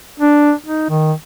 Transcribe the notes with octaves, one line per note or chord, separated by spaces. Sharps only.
D4
D#4
D#3